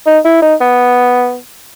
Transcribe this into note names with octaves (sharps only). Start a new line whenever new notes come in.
D#4
E4
D#4
B3